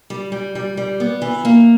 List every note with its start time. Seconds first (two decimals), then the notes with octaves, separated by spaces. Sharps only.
0.10 G3
0.32 G3
0.55 G3
0.77 G3
1.00 B3
1.22 E3
1.45 A#3